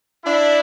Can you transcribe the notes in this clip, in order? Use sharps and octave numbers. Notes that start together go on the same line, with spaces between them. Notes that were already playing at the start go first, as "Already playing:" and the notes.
D4 E4